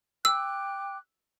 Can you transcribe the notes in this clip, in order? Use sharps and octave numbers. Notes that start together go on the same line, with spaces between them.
G5 D6 E6 F#6